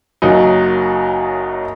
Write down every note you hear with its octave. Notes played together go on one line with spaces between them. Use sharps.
F#1 F#2 F#3 D#4